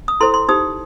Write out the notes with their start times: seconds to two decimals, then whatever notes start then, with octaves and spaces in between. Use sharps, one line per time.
0.08 D#6
0.20 E4 A4 C5 C6
0.34 C6
0.49 D#4 G4 C5 D#6